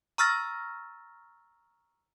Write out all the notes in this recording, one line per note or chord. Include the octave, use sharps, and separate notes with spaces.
A#5 C#6 E6 F6 A6 A#6